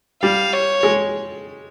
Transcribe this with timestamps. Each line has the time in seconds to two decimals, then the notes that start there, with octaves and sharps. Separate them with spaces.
0.23 G3 F5
0.54 C#5
0.83 G#3